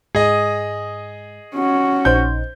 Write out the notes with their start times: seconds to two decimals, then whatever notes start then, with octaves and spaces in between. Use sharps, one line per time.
0.15 G#2 G#4 D#5
1.54 C#4 F#4
2.05 A#1 D#4 C5 G6